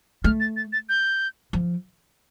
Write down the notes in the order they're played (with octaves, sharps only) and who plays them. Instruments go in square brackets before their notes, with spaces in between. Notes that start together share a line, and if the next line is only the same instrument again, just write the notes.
[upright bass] A3 [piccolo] F6
[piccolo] A6
A6
A6
G6
[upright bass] F3